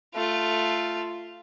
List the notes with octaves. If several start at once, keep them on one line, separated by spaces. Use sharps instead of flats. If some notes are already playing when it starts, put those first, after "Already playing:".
A3 F4